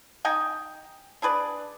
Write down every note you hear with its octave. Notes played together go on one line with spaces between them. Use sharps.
D#4 D#5 G5 G#5
D4 G#4 B4 D5